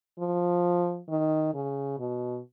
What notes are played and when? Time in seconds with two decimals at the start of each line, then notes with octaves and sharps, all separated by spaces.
0.19 F3
1.09 D#3
1.54 C#3
1.99 B2